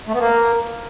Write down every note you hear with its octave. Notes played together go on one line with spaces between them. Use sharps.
A3
B3
A#3